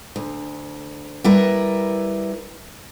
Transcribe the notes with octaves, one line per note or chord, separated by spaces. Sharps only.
D2
G3 E4 A#4 B4